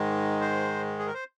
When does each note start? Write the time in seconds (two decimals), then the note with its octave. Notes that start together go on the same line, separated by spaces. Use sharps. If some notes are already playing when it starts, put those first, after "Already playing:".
Already playing: G#2 D#3 G#3
0.41 C5
0.99 G#4
1.06 A#4
1.14 C5